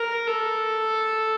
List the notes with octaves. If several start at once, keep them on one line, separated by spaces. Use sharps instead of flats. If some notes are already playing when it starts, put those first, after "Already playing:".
Already playing: A#4
A4